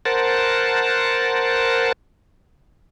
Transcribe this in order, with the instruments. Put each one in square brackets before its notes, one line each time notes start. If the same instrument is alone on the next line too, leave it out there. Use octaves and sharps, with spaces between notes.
[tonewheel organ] A#4 C5 F#5 A5